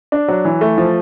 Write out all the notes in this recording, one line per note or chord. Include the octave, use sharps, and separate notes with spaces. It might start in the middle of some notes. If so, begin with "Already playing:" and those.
D4
F#3
E3
A3
F3